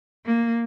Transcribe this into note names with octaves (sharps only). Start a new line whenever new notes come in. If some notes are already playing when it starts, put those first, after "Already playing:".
A#3